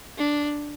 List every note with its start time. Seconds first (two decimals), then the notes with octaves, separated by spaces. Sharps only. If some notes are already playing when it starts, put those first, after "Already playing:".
0.18 D4